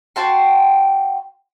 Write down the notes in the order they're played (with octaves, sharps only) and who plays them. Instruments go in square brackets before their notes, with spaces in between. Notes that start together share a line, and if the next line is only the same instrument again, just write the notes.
[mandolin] F#4 G5 A5 C6